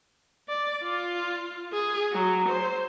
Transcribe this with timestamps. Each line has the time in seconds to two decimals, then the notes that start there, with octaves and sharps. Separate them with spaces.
0.49 D5
0.84 F4
1.73 G#4
2.13 F#3
2.48 C5